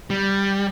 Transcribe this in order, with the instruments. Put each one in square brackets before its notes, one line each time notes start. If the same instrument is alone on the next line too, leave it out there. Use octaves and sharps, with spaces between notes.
[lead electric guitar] G3